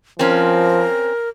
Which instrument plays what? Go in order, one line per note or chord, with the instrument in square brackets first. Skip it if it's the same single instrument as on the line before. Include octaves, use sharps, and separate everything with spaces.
[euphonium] F3 [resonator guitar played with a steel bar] C4 C#4 [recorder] A#4